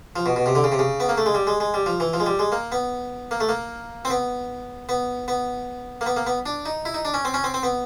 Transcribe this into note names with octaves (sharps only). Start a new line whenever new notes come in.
F3
B2
B2
C3
D3
C#3
C3
C#3
B3
A#3
A3
G#3
G3
G#3
G#3
G3
F3
E3
F3
G#3
G3
G#3
A#3
B3
A#3
A3
A#3
C4
B3
B3
B3
A#3
B3
A#3
B3
D4
D#4
E4
D#4
D4
C#4
C4
C#4
C4
C4
B3